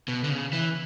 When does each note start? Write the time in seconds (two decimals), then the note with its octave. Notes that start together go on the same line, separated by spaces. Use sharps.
0.08 B2
0.24 D3
0.30 C#3
0.53 E3